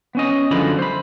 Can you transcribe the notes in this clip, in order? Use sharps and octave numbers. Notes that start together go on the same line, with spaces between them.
B3 C#4 D#5
F#2 D3 E3 F3 G#3 B5
C5 B5